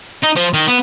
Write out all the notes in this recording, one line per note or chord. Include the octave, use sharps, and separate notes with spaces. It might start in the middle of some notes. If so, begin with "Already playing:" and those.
D#4
F3
D#3
B3